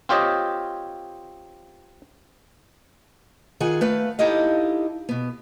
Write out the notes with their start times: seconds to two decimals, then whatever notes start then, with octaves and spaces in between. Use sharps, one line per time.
0.09 C4 F4 G4 C#5 D#5
3.60 D#3 F4 G#4 F#5 G#5
3.81 A3 B4 F5
4.19 D#4 E4 G4 A4 D#5 F5
5.09 B2 B3